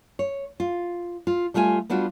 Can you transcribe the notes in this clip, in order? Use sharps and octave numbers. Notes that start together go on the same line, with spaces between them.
C#5
F4
F4
G3 A3 F4 F5 G#5
G3 B3 D4 F4 F#4